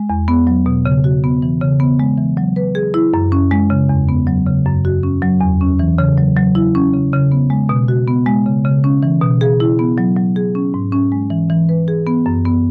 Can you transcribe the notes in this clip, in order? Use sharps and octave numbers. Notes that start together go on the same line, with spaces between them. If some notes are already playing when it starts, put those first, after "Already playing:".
Already playing: G#3
E2
B3
F#3
B2
C#3
F#4
B3
E3
C#3
B3
G#3
E3
F#3
B4
G#4
E4
F#2
C#4
G#3
C#3
E2
B3
F#3
C#3
F#2
F#4
C#4
F#3
E2
C#4
E3
C#3
F#3
F#3
E4
C#4
C#3
C#3
B3
G#3
B2
F#4
B3
G#3
C#3
C#3
C#4
E3
B2
G#4
E4
B3
F#3
F#3
G#4
C#4
G#2
C#4
G#3
E3
E3
B4
G#4
B3
F#2
B3